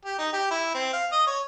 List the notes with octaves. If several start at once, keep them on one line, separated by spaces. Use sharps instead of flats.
G4
D#4
G4
E4
C4
F5
D#5
C#5